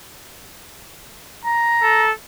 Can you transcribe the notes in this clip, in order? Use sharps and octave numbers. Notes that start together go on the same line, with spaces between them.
A#5
A4